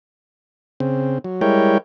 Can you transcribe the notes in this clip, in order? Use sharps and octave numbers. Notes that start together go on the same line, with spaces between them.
C#3 C4
F#3
G3 G#3 E4 A#4 C#5 G5